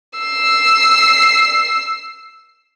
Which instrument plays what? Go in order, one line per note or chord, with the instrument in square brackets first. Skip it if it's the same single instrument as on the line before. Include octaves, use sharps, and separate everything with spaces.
[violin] E6 C7